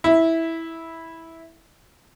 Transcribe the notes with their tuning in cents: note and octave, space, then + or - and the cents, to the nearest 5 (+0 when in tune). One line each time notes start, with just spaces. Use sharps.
E4 -10